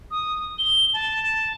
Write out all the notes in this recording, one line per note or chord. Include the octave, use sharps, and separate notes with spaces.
D#6
G7
A5